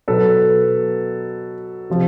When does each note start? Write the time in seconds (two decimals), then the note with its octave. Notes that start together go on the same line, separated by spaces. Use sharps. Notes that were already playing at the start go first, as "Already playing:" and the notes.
0.08 B2 F#3 A4 B4
1.90 C3 F3